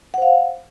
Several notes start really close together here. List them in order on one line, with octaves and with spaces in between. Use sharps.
F#5 C5 F5